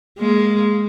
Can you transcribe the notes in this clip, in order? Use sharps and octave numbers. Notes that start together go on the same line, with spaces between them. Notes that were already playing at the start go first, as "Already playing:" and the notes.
G#3 A#3